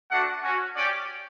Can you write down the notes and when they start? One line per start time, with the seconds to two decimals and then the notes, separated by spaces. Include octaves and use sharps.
0.10 A3 D4 F#4 F#5
0.43 C#4 F#4
0.76 C#4 G4 D5